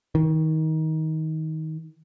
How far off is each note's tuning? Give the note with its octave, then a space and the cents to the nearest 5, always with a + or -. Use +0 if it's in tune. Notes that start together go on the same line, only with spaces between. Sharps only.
D#3 +25